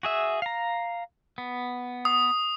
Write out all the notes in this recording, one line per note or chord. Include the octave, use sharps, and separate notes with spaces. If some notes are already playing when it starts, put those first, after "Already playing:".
F#4 G#4 E5
F5 A#5
B3
D#6